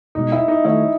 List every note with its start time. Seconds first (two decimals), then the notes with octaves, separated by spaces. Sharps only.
0.15 E2 B2 G#3 D#4
0.32 E4
0.48 D#4
0.65 D#3 A3 D#4 E4 A4 C#5